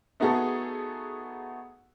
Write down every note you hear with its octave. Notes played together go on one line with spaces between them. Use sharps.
A3 B3 D#4 F#4 G#4 A4